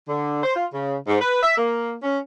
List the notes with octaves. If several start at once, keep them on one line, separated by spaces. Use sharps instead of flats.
D3
C5
F4
C#3
G#2
B4
E5
A#3
C#4